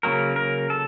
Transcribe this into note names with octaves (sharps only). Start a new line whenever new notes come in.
C#3 F#3 A#3 A#4
A#4
A4